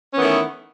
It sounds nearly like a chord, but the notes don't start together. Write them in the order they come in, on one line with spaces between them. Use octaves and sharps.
C#4 B3 E3 D#3 A3